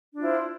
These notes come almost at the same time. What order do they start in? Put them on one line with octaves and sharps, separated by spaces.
D4 F4 E4 C5